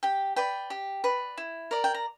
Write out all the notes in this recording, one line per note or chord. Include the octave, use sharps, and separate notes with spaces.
G4 G5
B4 D5 G5
G4
B4 D5
E4
A#4 D5
G5
A#5